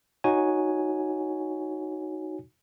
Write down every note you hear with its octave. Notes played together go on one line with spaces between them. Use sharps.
D#4 F#4 C#5 G#5